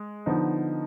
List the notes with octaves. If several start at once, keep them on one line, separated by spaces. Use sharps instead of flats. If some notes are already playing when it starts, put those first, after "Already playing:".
Already playing: G#3
D3 F3 B3 D#4